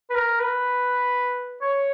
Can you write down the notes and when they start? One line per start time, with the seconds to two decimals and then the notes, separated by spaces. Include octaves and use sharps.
0.10 B4
0.15 A#4
0.40 B4
1.61 C#5